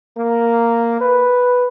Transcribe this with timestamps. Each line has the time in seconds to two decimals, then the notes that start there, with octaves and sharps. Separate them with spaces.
0.17 A#3
1.01 B4